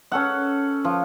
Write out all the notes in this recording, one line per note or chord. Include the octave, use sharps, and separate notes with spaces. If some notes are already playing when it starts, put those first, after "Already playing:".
C#4 A4 F#5
F3